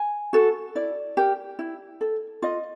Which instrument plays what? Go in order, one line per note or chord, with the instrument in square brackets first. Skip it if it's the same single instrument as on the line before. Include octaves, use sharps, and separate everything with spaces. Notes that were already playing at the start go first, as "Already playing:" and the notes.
Already playing: [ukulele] G#5
F#4 A4
E4 D5
G4 A#4
E4
A4
F4 D#5